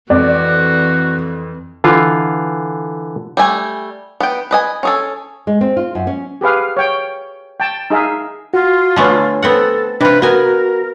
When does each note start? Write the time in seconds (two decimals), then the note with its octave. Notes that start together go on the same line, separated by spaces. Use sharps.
0.10 F2 E3 F#4 D5
1.84 D3 E3 F4
3.37 G3 A3 G#5
4.20 B3 G5
4.51 B4 D#5 G#5
4.83 C#4 G#4 A4
5.47 G#3
5.61 C4
5.77 F4
5.95 F#2
6.07 C#4
6.41 G4 G#4 B4 F5
6.77 C#5 G5
7.60 G5 A5
7.90 D#4 G#4 E5 F5
8.54 F4 F#4
8.96 D3 A3 B3 C#5 G#5 A5
9.43 B3 C4 A4 F#5
10.01 C3 D4 F4 B4
10.22 B3 F#4 A#4 G#5